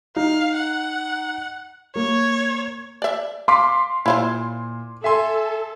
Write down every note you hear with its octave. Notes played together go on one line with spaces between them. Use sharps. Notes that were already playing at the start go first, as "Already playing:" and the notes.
D#4 F5
F#5
A#3 C#5
D5 E5
F5 C6 D6 B6
A#2 E4 F4 C5
A4 E5 G#5 C6